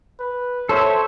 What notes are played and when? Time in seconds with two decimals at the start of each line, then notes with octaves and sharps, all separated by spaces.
0.20 B4
0.69 A4 C5 C#5 E5